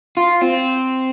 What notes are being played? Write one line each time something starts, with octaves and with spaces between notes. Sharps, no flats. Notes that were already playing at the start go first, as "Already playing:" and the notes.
F4
C4